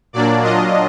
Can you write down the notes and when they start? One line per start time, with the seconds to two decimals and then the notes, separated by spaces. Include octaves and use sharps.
0.13 A#2 F#3 A#3 D4 D5
0.43 A#2 F#3 D4 F4 D#5